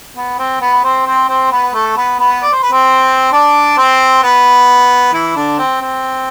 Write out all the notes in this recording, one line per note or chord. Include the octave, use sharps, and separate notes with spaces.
B3
C4
B3 B4
C4 C5
C4 C5
C4 C5
B3 B4
A3 A4
B3 B4
B3 B4
D5
C5
B4
C4 C5
D4 D5
C4 C5
B3 B4
E3 E4
D3 D4
C4
C4